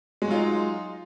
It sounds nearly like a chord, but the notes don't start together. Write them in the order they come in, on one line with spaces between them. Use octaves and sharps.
G#3 F#4 F#3 F4 D#4